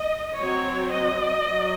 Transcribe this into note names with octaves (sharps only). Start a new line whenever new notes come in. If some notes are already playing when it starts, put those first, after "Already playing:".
Already playing: D#5
F#3 C4 C#5
D#5
F#3